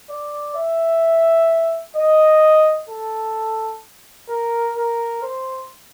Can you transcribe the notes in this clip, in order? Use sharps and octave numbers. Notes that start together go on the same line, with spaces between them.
D5
E5
D#5
A4
A#4
A#4
C5